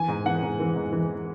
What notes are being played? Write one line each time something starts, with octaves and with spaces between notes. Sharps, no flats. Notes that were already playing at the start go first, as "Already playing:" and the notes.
Already playing: E3 G#5
G#2
E3 F#5
G#2
E3
G#2
E3